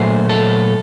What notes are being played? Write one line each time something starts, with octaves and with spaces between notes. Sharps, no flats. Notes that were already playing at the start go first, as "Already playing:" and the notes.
Already playing: A#2 F#3 A3 C5
A4